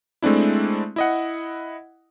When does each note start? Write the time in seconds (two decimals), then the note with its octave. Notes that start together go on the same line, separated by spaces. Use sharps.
0.22 G#3 A3 C4 D4 E4
0.96 E4 D#5 F#5